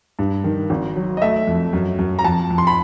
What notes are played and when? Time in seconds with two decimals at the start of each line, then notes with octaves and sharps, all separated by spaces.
0.19 G2
0.44 D#3
0.70 G#1
0.96 F#3
1.17 D#5
1.22 A3 E5
1.47 F2
1.73 F#2
1.99 F#2
2.19 A#5
2.24 F2 A5
2.50 F2
2.58 C6
2.67 B5